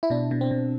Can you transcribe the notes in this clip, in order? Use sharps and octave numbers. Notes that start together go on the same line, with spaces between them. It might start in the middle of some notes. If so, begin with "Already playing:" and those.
E4
B2 D4
B2
C4
B2